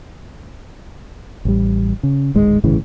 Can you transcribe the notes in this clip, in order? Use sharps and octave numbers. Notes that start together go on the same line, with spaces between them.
A1 G3
C#3
D1 G#1 G#2 G#3
G1 A2 C#3 E3